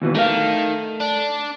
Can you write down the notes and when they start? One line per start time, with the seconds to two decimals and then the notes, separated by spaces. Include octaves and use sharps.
0.02 D#2 B2 E3
0.15 D#3 A3 F5
1.00 D4